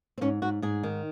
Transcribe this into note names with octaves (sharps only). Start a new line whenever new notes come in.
C4
G#2 C#4
G#2 F#4
G#2 G#4
D#3